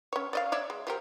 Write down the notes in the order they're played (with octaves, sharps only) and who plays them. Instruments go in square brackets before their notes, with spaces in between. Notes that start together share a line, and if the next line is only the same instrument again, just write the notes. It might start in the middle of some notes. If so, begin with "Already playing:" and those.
[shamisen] C#4 C#5
D5 D#5 F5
C#5 D5 E5
G#3
F3 G4 A#4